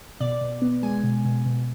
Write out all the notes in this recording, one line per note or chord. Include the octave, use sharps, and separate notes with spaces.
B2 D5
B2
B3
G#3 G#5
B2
B2
B2